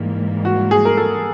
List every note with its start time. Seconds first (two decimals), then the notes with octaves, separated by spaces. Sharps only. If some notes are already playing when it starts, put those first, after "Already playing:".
Already playing: G#2 E3 G3 A#3
0.45 F#4
0.71 G#4
0.85 A#4
0.97 A4